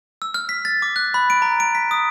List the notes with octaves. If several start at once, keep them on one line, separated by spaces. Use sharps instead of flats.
E6
F6
B6
A6
D6
F#6
B5
D7
A#5
D7
B6
D#6